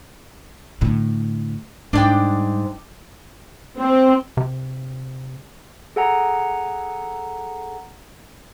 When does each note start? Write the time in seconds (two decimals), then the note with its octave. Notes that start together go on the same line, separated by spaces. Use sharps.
0.81 A2 D3
1.93 G#2 G3 D4 D5 G5
3.78 C4
4.37 C3
5.96 G#4 A4 F#5 G#5 A#5